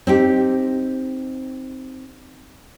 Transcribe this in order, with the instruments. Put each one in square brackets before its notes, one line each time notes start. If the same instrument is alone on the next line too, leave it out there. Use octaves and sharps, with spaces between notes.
[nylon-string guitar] C4 D#4 G4